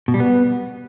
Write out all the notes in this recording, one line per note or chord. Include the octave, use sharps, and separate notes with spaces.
B2
G3
B3